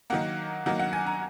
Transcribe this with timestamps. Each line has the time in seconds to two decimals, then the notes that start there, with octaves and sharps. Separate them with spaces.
0.10 D#3 F#3 A#3 F#5
0.66 D#3 F#3 A#3 F#5
0.79 F#5
0.93 G#5
1.07 A#5